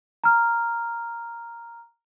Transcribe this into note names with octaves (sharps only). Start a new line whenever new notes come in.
A#5 F6